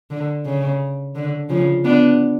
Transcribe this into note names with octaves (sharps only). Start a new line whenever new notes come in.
D3
C#3
D3
C#3 F3
B3 D4